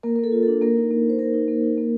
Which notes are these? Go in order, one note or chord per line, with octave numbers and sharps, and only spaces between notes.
A#3 A#4
A#4
A#3 A4
F4
A4
D4
A#3 A#4
D#4
A#3
D#4 C5
A#3 A#4
D#4
A#3
D#4
A#3